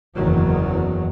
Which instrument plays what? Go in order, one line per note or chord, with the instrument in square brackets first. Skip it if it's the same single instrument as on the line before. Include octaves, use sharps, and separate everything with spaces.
[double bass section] F#1 E2 D#3 F#3